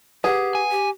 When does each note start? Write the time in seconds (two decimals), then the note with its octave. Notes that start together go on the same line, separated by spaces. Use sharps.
0.24 G4 G#4 B4 F#5
0.55 G#5
0.71 G4